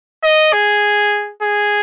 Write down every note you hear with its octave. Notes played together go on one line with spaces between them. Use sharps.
D#5
G#4
G#4